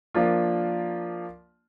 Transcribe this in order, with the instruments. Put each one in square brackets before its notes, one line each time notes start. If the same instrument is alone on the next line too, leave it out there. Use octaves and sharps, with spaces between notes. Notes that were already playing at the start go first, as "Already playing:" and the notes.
[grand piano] F3 A#3 D4 F4